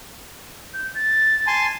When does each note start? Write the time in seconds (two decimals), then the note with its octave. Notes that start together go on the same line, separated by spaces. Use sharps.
0.74 G6
0.95 A6
1.47 G#5 A5 C6